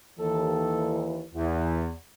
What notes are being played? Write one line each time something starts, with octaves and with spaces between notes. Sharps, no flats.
D#2 E3 A4
E2 E3